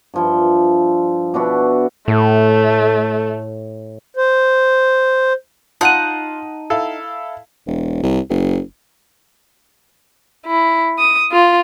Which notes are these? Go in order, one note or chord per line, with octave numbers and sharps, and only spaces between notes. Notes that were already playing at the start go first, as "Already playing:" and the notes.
G2 F3 E4
B2 D4 E4 F#4
A2 A3
C5
D#4 F4 F#5 A5 F#6 D#7
E4 A4 F5
E1
C2
F#1
E4
D#6
F4